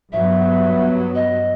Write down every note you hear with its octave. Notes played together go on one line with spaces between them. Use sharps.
G2 F#3 B3 E5
D#5